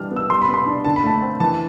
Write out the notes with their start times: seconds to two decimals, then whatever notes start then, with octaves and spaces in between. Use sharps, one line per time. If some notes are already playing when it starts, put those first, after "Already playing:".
Already playing: E3 G3 D4 F6
0.11 B3
0.16 E6
0.30 G3 C6
0.42 B5
0.48 B3
0.54 C6
0.66 D4
0.85 D3 A5
0.96 B5
1.03 A3 A5
1.22 C4
1.40 E3 A5